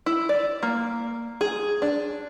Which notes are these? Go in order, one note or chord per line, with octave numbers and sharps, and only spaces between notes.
E4
D5
A#3
G#4
D4